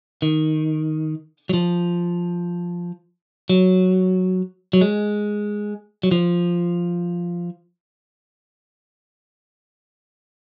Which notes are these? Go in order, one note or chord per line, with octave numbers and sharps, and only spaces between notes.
D#3
F#3
F3
F#3
F#3
G#3
F#3
F3